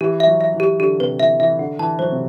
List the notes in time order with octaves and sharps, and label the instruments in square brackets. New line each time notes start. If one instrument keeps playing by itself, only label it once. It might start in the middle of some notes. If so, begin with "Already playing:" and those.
[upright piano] E3 [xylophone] G4
[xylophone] E5
[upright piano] F#3
[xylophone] E5
[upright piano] E3
[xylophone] G4
[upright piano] D3 [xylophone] G4
[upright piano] C3 [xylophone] B4
[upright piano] E3 [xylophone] E5
[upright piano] E3 [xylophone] E5
[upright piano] D3 [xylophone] F#5
[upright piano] E3 [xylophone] A5
[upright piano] F#3 [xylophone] C5
[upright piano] C3